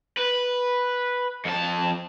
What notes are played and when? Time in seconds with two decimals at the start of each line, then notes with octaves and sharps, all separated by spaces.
0.18 B4
1.45 F2 A5